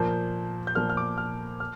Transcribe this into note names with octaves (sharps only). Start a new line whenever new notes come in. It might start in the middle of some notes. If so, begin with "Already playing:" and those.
Already playing: A#2 F3 A#3 G6
G6
A#2 F3 A#3 F6
F6
D6
F6
F6